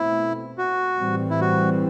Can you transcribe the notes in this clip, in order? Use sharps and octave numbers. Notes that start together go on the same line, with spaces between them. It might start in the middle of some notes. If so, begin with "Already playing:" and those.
Already playing: B2 A3 C4 E4
F#4
A2 E3 G3 C4
E4
F#4